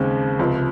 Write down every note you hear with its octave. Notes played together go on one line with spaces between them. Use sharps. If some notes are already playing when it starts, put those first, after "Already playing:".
Already playing: D#2 C#3 G#3 C4
C#2 C3 F3